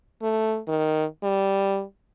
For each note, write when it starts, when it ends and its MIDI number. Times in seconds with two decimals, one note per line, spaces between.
0.22 0.60 57
0.68 1.05 51
1.23 1.84 55